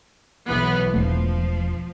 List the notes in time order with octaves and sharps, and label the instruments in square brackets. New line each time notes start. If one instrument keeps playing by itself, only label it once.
[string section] B1 E3 B3
[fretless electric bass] E1 A3 [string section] F3